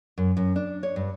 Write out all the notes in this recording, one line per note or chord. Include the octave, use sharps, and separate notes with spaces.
F#2
F#2
D4
C#5
G2